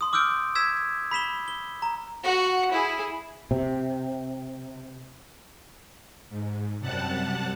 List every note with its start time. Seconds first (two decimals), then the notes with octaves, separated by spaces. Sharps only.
0.01 C6 D#6
0.13 D6 E6 F6 G6 D7
0.55 E6 G#6 B6 E7
1.11 B5 B6 E7 G7
1.48 G7
1.82 A#5
2.23 F#4 F#5
2.71 E4 G#4
3.51 C3
6.30 G#2
6.79 F#2 C3 G3 F#5 A5 F#6